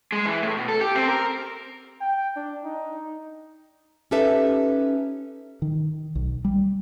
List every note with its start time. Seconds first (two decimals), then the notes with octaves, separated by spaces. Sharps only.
0.12 G#3
0.25 E3
0.43 A2
0.57 B2
0.68 A4
0.81 G4
0.95 C4
1.08 A#4
2.01 G5
2.36 D4
2.65 D#4
4.11 C#4 D#4 G4 A4 B4 E5
5.62 D#3
6.15 B1
6.45 G3